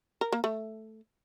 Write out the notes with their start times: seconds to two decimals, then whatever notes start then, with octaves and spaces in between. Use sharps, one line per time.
0.21 A#4
0.32 A#3
0.44 A3